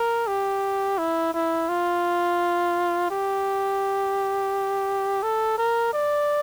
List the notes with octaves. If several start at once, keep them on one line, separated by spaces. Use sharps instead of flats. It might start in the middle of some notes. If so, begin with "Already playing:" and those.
Already playing: A#4
G4
E4
E4
F4
G4
A4
A#4
D5